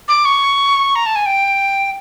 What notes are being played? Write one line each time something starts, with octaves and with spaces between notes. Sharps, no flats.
D6
C#6
A#5
A5
G#5
G5